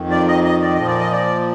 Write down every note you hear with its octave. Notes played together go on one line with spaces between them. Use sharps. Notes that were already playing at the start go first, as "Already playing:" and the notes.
Already playing: F2 D#3
D5
D#5
D#5
D5
A#2 F3 D#5
D5
D#5
D5